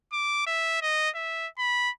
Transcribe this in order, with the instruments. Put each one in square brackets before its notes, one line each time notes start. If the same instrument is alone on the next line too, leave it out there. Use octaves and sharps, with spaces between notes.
[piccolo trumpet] D6
E5
D#5
E5
B5